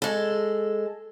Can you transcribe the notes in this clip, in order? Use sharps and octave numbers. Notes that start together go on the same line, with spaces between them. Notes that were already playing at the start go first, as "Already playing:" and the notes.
G#3 A4